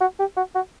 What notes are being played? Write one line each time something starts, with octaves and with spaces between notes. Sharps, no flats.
F#4
G4
F#4
F#4